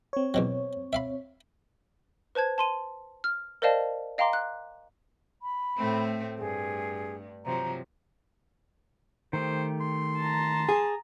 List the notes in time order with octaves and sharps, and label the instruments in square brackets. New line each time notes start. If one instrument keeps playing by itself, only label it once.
[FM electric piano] C4 C#5
[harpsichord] E2 B2 F#3
E5 F5 B5
[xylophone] B4 C5 A5 G#6
A5 C6 D#7
F6
A#4 C5 D5 D#5 F5 A5
D#5 F5 G5 A#5 C6 D6
F#6
[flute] B5
[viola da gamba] A2 A3 C4
[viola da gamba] G2 [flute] G#4
[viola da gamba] C3 F3 F#3 [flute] A#5
[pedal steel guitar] D#3 A3 G4 [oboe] C5
[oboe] C6
[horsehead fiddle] A5 A#5
[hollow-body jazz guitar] G#4